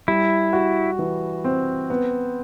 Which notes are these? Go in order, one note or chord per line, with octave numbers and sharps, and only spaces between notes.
G3 E4
F#4
E3
C4
B3